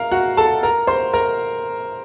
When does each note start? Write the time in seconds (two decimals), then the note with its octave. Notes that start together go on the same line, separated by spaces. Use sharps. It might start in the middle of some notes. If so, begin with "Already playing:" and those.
Already playing: A#4 F5 A#5
0.12 F#4 F#5
0.37 A4 A5
0.63 A#4 A#5
0.87 C5 C6
1.13 A#4 A#5